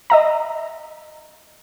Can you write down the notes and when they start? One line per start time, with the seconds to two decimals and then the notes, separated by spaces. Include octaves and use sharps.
0.10 D#5 E5 A#5